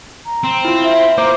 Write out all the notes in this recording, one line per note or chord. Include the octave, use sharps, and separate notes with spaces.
A#5
C4
E4 F4
E5
A#3 C5 A#5 D6